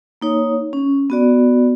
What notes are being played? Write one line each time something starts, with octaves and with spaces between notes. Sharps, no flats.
A#3 D#4 C#5
C#4
B3 F#4 D5